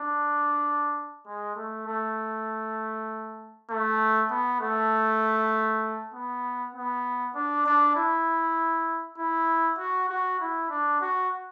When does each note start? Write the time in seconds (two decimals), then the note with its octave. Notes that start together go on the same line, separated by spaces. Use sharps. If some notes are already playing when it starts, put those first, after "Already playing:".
Already playing: D4
1.27 G#3
1.56 A3
1.87 A3
3.70 A3
4.30 B3
4.61 A3
6.14 B3
6.75 B3
7.35 D4
7.66 D4
7.96 E4
9.18 E4
9.78 F#4
10.10 F#4
10.40 E4
10.69 D4
11.01 F#4